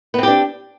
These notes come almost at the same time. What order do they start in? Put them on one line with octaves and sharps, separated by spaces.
B3 C4 G4 D4